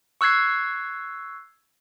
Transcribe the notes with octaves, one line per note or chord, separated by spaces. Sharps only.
C#6 E6 F#6 G#6 C7